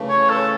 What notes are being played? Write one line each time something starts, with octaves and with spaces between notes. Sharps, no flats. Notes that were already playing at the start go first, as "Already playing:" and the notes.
Already playing: C#3 E3 A3
C#5
A4